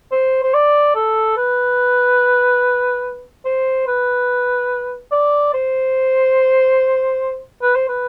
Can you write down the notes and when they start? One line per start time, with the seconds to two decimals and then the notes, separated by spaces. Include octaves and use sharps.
0.12 C5
0.43 C5
0.54 D5
0.95 A4
1.37 B4
3.45 C5
3.87 B4
5.12 D5
5.54 C5
7.62 B4
7.75 C5
7.89 B4